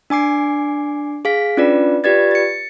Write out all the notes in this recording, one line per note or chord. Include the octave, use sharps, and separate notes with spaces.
D4 G#5 D6 C7
G#4 F5 B6
C#4 D4 F4 B4 D5
F4 G4 B4 D5 G#6 A6
A6 C#7